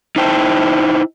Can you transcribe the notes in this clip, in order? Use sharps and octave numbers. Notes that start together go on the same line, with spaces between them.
D#4 E4 C5 G5 A5